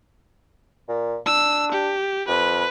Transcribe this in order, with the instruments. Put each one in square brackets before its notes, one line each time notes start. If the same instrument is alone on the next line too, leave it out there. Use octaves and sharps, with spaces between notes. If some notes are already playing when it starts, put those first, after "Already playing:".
[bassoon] A#2
[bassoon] D4 [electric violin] E6
[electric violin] G4
[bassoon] F2 [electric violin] B4